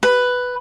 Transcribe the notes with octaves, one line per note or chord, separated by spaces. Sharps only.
B4